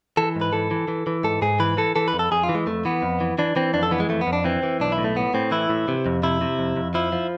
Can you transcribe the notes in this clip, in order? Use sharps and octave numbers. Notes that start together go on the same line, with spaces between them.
E3 A4
G#2
B4
E3 A4
E3
E3
E3
G#2 A4
G#2 G#4
E3 B4
E3 A4
E3 A4
B4
F2
A4
F2 G#4
F4
E3
G#3
F2 A3
E3 B3
F2
E3
E3 D4
E3 C4
F2 D4
A4
E3 B3
G#3
F2 A3
B3
F2
D4
E3 C4
E3
B1 D4
E4
A2
A3
A2 B3
A2 C4
E3 E4
A2
C3
F2
C3 E4
C3
F2
F2
F3 E4
F3